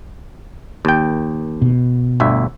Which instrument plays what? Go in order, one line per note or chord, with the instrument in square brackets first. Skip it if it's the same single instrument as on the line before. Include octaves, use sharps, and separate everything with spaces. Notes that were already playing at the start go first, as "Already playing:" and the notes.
[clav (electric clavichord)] D#2 G5
[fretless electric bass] B2
[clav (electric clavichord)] G1 D2 E5